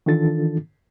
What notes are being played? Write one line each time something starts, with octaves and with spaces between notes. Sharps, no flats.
D#3 E3 D4 F4 A4 A6